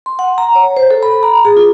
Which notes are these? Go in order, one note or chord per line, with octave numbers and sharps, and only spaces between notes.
C6
F#5
A#5
C#5
C5
A4
B5
A#5
G#4
F4